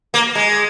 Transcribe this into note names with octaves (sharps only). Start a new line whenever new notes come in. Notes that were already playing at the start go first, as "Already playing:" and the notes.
A#3
G#3